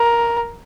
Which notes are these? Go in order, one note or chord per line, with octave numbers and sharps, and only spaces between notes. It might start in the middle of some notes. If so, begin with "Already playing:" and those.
Already playing: A#4